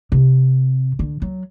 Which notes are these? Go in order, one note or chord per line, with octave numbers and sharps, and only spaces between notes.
C3
D3
F#3